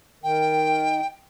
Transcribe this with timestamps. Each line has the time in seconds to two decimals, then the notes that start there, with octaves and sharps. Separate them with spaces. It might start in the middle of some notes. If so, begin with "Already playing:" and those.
0.24 D#3 G5